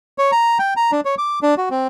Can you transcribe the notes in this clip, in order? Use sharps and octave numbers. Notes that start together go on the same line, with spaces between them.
C#5
A#5
G5
A#5
D4
C#5
D6
D4
F#4
C4